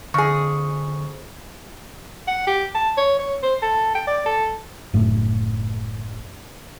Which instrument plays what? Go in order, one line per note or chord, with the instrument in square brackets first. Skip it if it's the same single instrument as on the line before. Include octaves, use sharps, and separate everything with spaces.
[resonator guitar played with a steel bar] F2 G#4 [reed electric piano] D3 C#6
[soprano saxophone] F#5
G4
A5
C#5
C#5
C5
A4
G5
D5
A4
[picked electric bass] F#1 A2